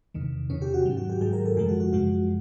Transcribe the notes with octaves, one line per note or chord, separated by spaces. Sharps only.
E2 C3 D#3
E2 C3 D#3 C#4
G4
F#4
G#2 D#3 F#3
F#4
G4
G#2 D#3 F#3 G#4
A#4
A4
F#2 C#3 F3 G#3 G#4
F#4
F#4
F#2 C#3 F3 G#3 F#4